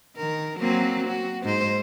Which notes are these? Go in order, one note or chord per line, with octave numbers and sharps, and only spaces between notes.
D#3 A#4
F#3 A#3 C4
F#4
G#2 C5